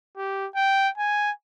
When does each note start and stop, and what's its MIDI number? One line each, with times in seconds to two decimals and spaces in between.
0.17 0.47 67
0.55 0.89 79
0.98 1.31 80